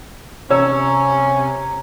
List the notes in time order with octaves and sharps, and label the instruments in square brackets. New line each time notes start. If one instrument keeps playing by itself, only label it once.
[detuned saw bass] C3 [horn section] C#4 [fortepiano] C#5 E6 [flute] A#5